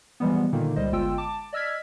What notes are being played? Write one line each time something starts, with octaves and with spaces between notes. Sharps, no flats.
E3 F3 G3 G#3 B3
A#2 D3 D#3 A#3 D#4
C#2 G3 C5 D#5
G1 G#3 F4 G5 E6
A5 D6
D5 D#5 E6 F6 G#6 B6